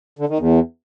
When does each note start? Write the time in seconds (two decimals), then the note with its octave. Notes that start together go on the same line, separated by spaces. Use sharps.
0.19 D3
0.29 D#3
0.39 E2